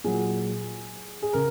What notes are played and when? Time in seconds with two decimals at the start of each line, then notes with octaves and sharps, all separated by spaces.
0.04 A#2 F#3 G#4
1.22 G#4
1.33 C#3 A#4